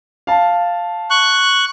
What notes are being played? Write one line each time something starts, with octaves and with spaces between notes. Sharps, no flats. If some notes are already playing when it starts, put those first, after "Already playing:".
F5 A5
C#6 F#6